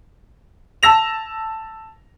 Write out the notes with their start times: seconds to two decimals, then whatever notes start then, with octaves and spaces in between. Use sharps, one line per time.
0.83 A5 E6 A#6 F7